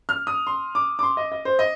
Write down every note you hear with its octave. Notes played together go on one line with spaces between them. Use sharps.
F6
D#6
C6
D6
D6
C6
D#5
D#5
C5
D#5